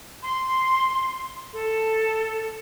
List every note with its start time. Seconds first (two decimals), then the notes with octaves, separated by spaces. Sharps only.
0.23 C6
1.53 A4